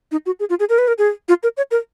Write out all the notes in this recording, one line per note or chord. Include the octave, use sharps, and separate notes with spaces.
D#4
F#4
G#4
F4
G#4
A#4
B4
A#4
G#4
F4
A#4
C#5
A#4